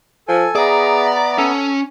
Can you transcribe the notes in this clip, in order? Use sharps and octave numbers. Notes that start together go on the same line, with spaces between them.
F3 A4 G#5
B3 G#4 D5 E5 A#5
C#4 A4